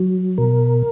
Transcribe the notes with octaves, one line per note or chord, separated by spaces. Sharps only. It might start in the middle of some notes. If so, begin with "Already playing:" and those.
Already playing: F#3
B2 A#4